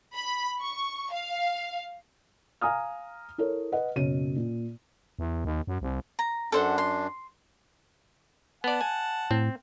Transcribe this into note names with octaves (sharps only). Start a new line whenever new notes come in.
B5
C#6
F5
F5 G#5 A#5 D#6 F6
E4 A4 A#4 C#5
B4 D#5 F#5
F#1 B2 C#5 D#7
A#2
E2
D#2
F#2
C2
A#5
F#2 D4 A4 C5 F#5
C6
B3 D5 F#5 A5
G#5
A2 C4